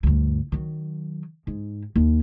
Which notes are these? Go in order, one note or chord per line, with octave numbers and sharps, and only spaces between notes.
D2 G2
D#3 F#3
G#2
D#2